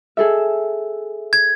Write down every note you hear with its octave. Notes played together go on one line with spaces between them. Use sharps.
G#4 A4 E5
G#6